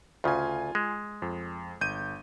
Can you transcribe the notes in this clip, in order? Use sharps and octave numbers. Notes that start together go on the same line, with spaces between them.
D2 C#3 F4 G#5
G#3
F2
G1 G6 D#7